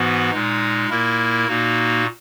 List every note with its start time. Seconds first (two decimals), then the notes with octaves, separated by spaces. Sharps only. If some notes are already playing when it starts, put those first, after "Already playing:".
Already playing: G#2 E3 B3 F#4
0.31 A#2 G#3 D#4
0.90 A#2 A#3 E4 A#4
1.48 A#2 A#3 D#4 F#4